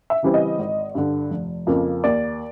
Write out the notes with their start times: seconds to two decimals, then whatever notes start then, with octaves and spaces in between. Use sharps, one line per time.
0.10 E5
0.23 C#3 E3 G3 C4
0.34 D#5
0.59 G#1
0.95 G2 D3
1.31 F1
1.67 F2 C#3 F3 A#3
2.04 D#2 D5